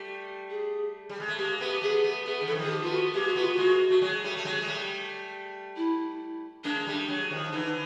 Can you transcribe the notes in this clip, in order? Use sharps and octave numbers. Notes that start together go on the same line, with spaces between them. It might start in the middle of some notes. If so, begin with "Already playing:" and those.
Already playing: G3 A3
G#4
G3
G#3
A3
G#3 A#3 G4
A3 B3
G4
A3 B3 G#4
A3 B3
A3 B3 G#4
D#3
E3 A4
D#3 F3
G#4
G4
A3 B3 F4
F#4
G#3 A#3 G4
F#4
A3 B3
F4
G#3 A#3 F#4
A3
F#3 G#3
G3 A3
A3
F#3 G#3
G#3
G3 A3
E4
G#3 A#3 D4
A#3
G3 A3
F#3 G#3
D#3 F3
D3 E3 D#4